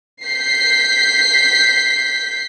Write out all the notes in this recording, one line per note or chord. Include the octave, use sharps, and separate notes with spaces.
G6 B6 C7